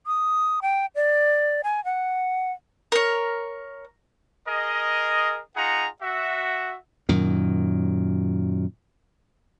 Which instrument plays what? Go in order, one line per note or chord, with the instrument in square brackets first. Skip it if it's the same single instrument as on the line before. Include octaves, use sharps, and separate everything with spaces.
[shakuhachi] D#6
G5
D5
G#5
F#5
[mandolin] A#4 C#5
[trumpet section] G#4 A#4 D#5
D#4 F4 G#4 F#5 A#5
F#4 E5
[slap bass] F#2 A#2 D#3